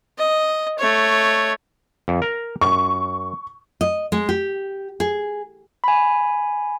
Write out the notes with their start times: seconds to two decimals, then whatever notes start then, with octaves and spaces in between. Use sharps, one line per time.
0.18 D#5
0.78 A3 C#5
2.08 F2
2.22 A#4 A#5
2.61 F#2 C#6
3.81 D#5
4.12 G#3
4.29 G4
5.00 G#4
5.84 G#5 B5